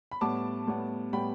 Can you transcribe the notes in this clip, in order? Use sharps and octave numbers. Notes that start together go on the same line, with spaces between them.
B5
A2 G3 B3 A5 D6
A2 G3 B3
A2 G3 B3 G5 B5